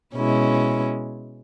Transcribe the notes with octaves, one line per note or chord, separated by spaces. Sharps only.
B2 G#3 C#4 E4